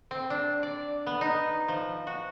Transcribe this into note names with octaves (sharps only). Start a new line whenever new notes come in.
C4
D4
D5
B3
D#4
F3
F#4